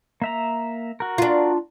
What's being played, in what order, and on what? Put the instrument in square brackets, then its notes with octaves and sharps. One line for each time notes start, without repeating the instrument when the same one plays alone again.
[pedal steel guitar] A#3 E5 A#5
F#4 A#4
[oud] D4 F4